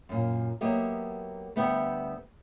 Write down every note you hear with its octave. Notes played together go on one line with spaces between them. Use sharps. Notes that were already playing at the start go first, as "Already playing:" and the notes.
F#2 A#2
F#3 A#3 B3 G4 D#5 E5
D2 G3 B3 E5 F#5 G5